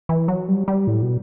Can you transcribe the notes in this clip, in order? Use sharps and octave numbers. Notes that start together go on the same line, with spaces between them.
E3
F#3
G3
G3
A2
B2